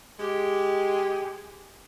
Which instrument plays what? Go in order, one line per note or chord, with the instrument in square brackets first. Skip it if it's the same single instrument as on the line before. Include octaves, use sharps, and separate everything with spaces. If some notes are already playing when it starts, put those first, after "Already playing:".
[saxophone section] G#3 G4